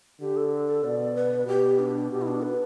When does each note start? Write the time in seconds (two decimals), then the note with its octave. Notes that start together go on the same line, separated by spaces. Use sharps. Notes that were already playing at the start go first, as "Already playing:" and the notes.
0.20 D3 G4
0.37 A4
0.68 A4
0.84 B2 D5
1.16 B4
1.47 B2 G4
1.79 D4
2.12 B2 G4
2.22 E4
2.27 D4
2.42 B4